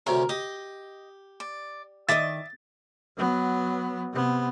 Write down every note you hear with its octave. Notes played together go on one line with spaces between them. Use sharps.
D2 C3 C#4 A#4
G4 D#5
D5
D#3 D#5 E5 D6 D#6 A6
F#3 B3
C3 B3